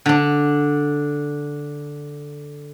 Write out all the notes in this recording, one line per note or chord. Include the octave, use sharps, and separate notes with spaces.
D3 D4